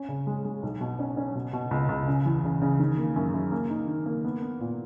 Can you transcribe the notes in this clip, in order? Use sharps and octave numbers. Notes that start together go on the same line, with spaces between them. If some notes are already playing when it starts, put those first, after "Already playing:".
Already playing: C#4
C#3
G#3
G#3
B1
B2
C#4
C#4
B2
B2
C#2
C#2
C#3
E2
C#3
C#3
D#3
A#3
F#2
F#2
A#3
D#4
D#3
A#3
B3
B3
A#2